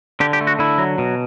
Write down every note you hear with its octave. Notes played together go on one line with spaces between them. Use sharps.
D3 G4
G4
A3
F#4
D3 E4
F#3
B2